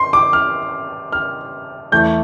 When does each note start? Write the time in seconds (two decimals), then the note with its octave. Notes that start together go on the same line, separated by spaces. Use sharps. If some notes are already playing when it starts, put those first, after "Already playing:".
Already playing: C6
0.13 D6
0.33 F6
1.12 F6
1.92 E2 E3 A3 G6